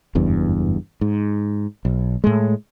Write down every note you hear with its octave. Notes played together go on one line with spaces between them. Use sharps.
F#1 E2 G2
G#2
B1
A2 G#3